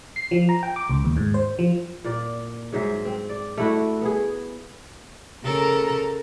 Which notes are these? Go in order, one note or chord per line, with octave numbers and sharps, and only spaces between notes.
C7
F3
A#5
G5
D6
C#2
D#2
G#2
C5
F3
A#2 D5
G#2 F#3 C5 E5
C4
D5
A3 E4 F#4
B3 G#4
C#3 A4 A#4